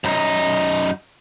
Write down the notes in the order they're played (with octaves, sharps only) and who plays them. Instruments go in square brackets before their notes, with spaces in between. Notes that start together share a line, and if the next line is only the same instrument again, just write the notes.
[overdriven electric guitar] F#2 D#4